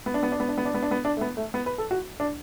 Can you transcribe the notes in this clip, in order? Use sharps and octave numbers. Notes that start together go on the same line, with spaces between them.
B3
D4
B3
D4
B3
D4
B3
D4
B3
D4
B3
D4
A3
B3
A3
B3
B4
A4
F#4
D4